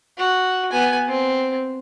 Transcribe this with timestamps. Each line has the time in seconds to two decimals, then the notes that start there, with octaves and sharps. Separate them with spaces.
0.18 F#4
0.71 B3 G#5
1.08 C4